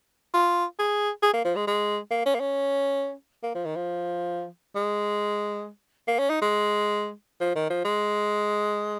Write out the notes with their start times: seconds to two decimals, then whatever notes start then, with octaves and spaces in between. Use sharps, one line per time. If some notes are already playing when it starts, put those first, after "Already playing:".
0.34 F4
0.79 G#4
1.23 G#4
1.33 A#3
1.45 F3
1.56 G#3
1.67 G#3
2.11 A#3
2.26 C#4
2.35 A#3
2.40 C#4
3.43 A#3
3.55 F3
3.66 D#3
3.76 F3
4.75 G#3
6.08 A#3
6.19 C#4
6.30 D#4
6.42 G#3
7.40 F3
7.55 D#3
7.70 F3
7.85 G#3